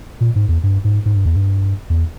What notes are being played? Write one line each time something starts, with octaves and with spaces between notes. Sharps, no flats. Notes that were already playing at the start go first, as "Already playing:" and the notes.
A#2
G#2
E2
G2
G#2
G#2
G2
E2
G2
E2